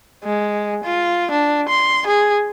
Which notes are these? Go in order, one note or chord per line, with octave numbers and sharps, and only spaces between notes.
G#3
F4
D4
C6
G#4